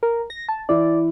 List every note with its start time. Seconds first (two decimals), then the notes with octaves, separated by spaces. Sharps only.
0.03 A#4
0.30 A#6
0.49 A5
0.69 E3 E4 D5